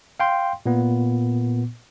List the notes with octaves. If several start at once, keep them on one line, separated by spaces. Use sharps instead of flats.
F5 G5 C6
A#2 B3